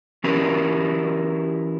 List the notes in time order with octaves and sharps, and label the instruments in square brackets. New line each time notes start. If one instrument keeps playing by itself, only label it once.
[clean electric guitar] E3 C#4 E4 F#4 G4 A#4